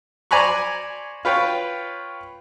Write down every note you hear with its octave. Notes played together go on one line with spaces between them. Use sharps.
C5 D5 G#5 A#5 B5 C#6
F4 B4 C#5 G5